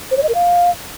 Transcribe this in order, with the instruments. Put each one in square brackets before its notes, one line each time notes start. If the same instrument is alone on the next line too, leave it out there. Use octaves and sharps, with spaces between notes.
[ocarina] C5
C#5
D#5
A#4
F5